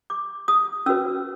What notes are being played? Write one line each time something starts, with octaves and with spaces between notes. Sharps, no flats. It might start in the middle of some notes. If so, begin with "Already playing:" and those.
D6
D#6
C#4 F#4 B4 E6